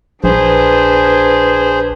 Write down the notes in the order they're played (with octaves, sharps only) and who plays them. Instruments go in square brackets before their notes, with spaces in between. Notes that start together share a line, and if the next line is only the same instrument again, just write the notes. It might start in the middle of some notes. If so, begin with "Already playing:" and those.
[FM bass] A#1 [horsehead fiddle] D4 B4 [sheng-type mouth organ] G#4 C5